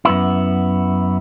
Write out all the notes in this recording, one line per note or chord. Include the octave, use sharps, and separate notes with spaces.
F#2 B3 E4